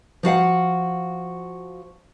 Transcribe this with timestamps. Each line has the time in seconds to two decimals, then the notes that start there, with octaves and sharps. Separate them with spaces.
0.23 F3 F#4 F5 F#5